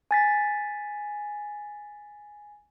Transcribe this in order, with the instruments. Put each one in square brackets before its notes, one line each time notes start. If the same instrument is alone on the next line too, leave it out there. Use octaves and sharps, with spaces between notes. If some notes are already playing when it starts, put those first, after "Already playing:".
[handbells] G#5 A6 B6